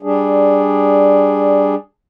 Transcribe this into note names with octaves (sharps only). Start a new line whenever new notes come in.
G3 D4 G#4